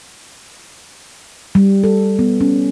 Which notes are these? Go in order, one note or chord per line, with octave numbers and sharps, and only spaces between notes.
G3
A4
B3
C#4